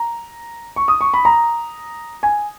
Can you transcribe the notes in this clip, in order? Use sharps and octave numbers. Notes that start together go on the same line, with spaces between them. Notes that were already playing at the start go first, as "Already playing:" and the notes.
Already playing: A#5
C#6
D#6
C#6
B5
A#5
G#5